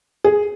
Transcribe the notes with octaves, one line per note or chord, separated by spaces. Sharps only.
G#4